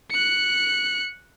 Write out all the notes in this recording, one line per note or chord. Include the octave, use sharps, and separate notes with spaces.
F#6 C#7